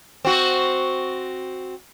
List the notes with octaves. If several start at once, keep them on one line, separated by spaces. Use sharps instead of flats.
C4 F#4